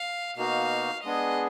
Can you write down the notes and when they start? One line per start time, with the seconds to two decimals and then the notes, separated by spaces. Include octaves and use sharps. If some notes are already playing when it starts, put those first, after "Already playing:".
Already playing: F5
0.36 B2 A#3 D#4 F#4 F5
1.04 G#3 B3 D4 G#4 D#5